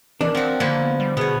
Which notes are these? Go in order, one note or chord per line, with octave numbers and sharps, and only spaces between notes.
E3 D4 A#4
F3 C4 F#4
D3 F3 A#3 E4
B3
G3
B2 B3 G#4 C#5